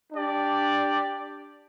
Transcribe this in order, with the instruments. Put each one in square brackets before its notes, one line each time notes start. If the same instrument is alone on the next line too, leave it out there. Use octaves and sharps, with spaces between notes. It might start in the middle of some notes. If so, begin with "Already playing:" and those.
[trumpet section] D4 G4 D5